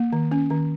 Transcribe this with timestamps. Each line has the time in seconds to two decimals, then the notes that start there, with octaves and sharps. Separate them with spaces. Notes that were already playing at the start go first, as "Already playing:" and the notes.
Already playing: A#3
0.13 D#3
0.31 C#4
0.50 D#3